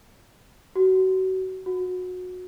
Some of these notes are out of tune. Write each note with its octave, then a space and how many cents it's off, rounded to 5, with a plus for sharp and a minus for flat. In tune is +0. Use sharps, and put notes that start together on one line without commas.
F#4 +30
F#4 -25